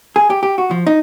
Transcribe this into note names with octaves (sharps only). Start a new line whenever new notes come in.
G#4
G4
G4
F#4
F3
D#4